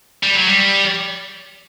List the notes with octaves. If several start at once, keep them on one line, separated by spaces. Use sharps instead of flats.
G3
F#3
G3